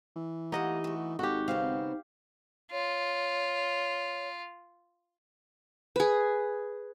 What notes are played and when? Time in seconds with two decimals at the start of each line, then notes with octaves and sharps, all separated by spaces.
0.16 E3
0.52 A3 A#3 D#4 G4 D#5 F#5
0.84 A3 F#4
1.19 G#1 D#4 F#4 G4 A4
1.48 C#3 B3 C4 F5
2.72 F4 C#5
5.96 G#4 B4